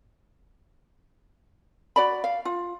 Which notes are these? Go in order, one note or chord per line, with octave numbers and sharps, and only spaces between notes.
F#4 D5 B5
F5
F4